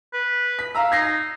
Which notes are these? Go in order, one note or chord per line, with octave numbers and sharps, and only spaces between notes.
B4
B6
F5 A#5 E6
D#4 G#6 A#6 C7